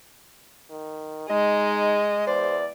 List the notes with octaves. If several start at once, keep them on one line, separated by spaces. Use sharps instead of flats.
D#3
G#3 D#4 D#5
E2 C5 D5